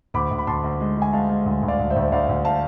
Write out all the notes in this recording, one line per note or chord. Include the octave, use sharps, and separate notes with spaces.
D2 B5 D6
D2
B5
D2 A5 C6
D2
G#3
G#3
G#5
G#3 F5 A5
G#3
D2
D2
D5 F5
D2
C5 E5
D2
D2 D5 F5
D2
F5 A5